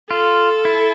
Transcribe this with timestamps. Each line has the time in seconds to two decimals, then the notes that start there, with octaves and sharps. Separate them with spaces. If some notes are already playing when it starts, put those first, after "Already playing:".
0.10 F4 A4
0.65 E4